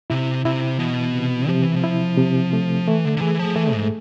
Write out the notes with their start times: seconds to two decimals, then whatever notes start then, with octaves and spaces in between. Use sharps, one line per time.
0.10 C3 E4
0.45 C3 E4
0.79 B2 E3
1.14 C3
1.48 C3 F3
1.62 E3
1.76 F3
1.84 E4
2.17 C3
2.53 A3
2.87 E3 A3
3.05 D3
3.17 D3
3.21 E3 G#4
3.39 F3
3.56 E3 A3
3.73 G#2